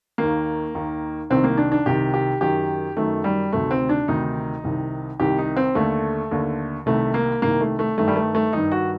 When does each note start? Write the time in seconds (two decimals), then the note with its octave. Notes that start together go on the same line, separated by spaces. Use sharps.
0.18 D#2 D#3 A#3
0.74 D#2 D#3
1.30 C2 C3 D#3 C4
1.44 A#3
1.58 D4
1.72 D4
1.86 C2 C3 D#3 G4
2.14 G4
2.41 F#2 D#3 G4
2.97 F#2 D#3 A3
3.24 G3
3.53 D2 C3 D#3 A3
3.71 C4
3.89 D4
4.08 D2 C3 D#3 D#4
4.64 C2 C3 D#3
5.20 C2 C3 D#3 G4
5.38 D#4
5.56 C4
5.75 D#2 D3 A3
6.31 D#2 D3
6.86 C2 C3 D#3 A3
7.14 A#3
7.42 C2 C3 D#3 A#3
7.61 A3
7.79 A3
7.98 G2 D#3 A3
8.08 G3
8.16 A3
8.35 A3
8.53 G2 D#3 D#4
8.72 F#4